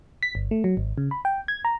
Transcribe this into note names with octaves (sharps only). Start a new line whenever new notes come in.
B6
G1
A3
F#3
G#1
C#3
B5
G5
G#6
A#5